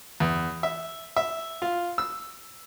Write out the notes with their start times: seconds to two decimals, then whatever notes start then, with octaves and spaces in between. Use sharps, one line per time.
0.20 E2
0.63 E5
1.17 E5
1.62 F4
1.98 E6